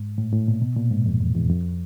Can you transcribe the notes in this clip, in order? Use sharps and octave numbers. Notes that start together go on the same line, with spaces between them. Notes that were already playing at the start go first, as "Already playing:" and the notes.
Already playing: G#2
A2
A2
A#2
B2
A#2
G#2
F2
E2
E2
F2